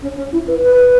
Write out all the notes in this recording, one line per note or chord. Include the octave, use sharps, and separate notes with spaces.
C#4
C#4
E4
B4
B4